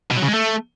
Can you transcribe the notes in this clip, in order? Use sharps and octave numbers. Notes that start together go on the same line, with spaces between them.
B2
F#3
C#3
G#3
A3